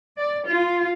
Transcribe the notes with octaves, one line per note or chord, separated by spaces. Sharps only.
D5
F4